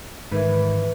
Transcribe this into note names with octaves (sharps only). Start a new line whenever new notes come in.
G#2 D#3 E3 B4